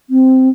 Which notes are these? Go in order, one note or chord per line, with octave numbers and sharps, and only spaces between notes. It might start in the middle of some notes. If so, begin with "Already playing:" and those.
C4